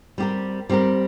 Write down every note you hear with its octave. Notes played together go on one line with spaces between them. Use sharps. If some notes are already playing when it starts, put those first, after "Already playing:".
G3 C4 G4 A#4
G3 C4 G4 A#4